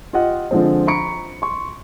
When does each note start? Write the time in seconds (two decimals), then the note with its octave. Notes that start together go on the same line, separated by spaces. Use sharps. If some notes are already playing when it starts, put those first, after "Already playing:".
0.13 F4 G4 D#5 F#5
0.51 D3 F3 G#3 C4
0.87 A#5 B5 C#6 C#7 D7
1.42 C6 C#6